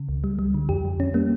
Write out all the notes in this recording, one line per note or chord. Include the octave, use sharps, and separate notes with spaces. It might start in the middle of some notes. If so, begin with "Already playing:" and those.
Already playing: C#3
C#2
G3
G3
D3
F2 G4
F2
F2 C#4
G3 A#3